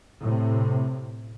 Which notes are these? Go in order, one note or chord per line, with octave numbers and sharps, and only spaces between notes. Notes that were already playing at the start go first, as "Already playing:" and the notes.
A2 C3